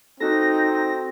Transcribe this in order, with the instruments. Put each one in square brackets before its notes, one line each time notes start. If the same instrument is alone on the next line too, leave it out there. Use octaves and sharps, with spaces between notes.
[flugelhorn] C4 [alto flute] D#4 [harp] F#4 A4 [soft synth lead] A#6